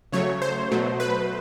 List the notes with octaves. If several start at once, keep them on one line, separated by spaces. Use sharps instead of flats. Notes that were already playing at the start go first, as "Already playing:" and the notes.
C#3 F#3 A3 C#5
C5
B2 F#3 A3
B4